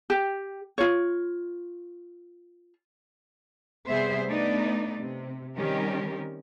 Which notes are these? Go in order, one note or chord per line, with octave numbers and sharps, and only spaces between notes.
G4
F4 C#5
C3 G3 B3 G#4 C5 E5
A3 B3 D4 D#4 D5
C3
D#3 G3 C4 C#4 G4 A#4